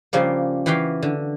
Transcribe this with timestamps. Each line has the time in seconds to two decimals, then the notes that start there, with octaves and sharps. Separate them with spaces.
0.13 C#3 F3 G3 A#3
0.66 E3 F#4 G4 F5 G5
1.02 D3